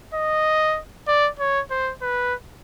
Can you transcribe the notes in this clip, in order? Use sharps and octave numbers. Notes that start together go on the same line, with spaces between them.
D#5
D5
C#5
C5
B4